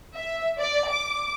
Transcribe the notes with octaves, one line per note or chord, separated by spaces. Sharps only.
E5
D5
D6